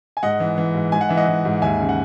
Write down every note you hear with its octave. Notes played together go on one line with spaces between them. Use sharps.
G#5
G#2 D#5 F#5
E3
E3
G#2
G#2 G#5
F#5
E3 E5
D#5 F#5
E3
G#2
D#2 E5 G#5
C#3
F#5